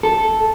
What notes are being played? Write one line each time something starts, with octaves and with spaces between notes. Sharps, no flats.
A4